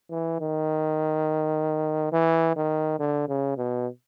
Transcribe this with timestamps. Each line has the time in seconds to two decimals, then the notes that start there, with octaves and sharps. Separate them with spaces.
0.10 E3
0.40 D#3
2.12 E3
2.56 D#3
2.99 D3
3.28 C#3
3.57 B2